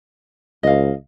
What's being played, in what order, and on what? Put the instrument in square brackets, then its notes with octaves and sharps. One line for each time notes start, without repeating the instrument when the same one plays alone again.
[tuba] C#2 [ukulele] D#5 F5